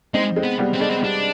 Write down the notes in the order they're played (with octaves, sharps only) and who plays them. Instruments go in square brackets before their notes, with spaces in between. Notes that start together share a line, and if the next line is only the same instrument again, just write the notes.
[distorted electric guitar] G#3 [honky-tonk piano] C4 D#4
[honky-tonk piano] G#3 C4
[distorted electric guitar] B3
[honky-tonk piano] G3 B3
[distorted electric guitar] C4
[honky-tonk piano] G#3 [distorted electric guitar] D4
[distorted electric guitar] C4
[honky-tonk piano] G3 [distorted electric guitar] D4